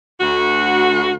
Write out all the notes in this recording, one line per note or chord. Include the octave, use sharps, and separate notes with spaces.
D2 F#4